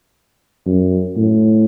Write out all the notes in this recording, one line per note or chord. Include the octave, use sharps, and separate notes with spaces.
F#2
A2